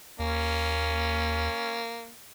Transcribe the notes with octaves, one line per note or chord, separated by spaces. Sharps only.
D#2 A#3 C#4